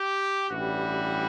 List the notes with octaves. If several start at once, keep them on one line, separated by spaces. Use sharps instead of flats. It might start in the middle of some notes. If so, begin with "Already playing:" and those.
Already playing: G4
A1 G2 E3 G3 F#4